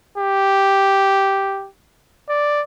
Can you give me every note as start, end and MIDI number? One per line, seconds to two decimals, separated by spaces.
0.18 1.68 67
2.29 2.62 74